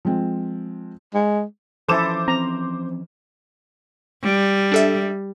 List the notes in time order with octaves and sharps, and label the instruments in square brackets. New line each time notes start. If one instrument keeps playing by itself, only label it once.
[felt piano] F3 G#3 C4
[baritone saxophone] G#3
[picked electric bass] E3 F3 C#4 [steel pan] E4 A4 [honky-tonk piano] C5 D6 E7
[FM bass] C4 [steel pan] A#5
[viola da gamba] G3
[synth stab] D4 A4 E5